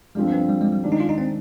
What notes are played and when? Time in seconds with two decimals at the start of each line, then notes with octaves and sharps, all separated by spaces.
0.15 G2 D3 F3 G#3 C4
0.32 B3
0.49 G3
0.61 G#3
0.72 G3
0.84 D#3 G#3 D4
0.92 D#4
1.00 F4
1.09 D#4
1.18 C4